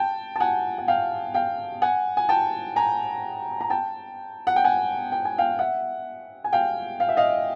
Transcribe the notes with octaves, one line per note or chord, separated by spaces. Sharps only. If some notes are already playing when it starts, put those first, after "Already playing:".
Already playing: G5 A5
A5
F#5 G#5
F#5
F5 G5
F5 G5
F#5 G#5
G#5
G5 A5
G#5 A#5
A#5
G5 A5
F#5
G5
F#5 G#5
G5
G#5
F5 G5
E5 F#5
G#5
F5 G5
F5
E5
D#5 F5